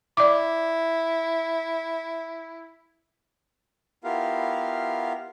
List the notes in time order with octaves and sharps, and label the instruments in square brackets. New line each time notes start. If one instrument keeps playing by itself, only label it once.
[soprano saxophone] E4 [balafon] D5 D6
[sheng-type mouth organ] B3 E4 F4 G4 A#4 F5